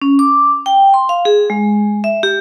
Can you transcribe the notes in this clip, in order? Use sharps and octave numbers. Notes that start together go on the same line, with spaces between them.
C#4
D6
G5
C6
F5
G#4
G#3
E5
G4